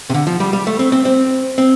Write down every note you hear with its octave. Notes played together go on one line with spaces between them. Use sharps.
C3
D3
F3
G3
G3
A3
C4
C4
C4
C4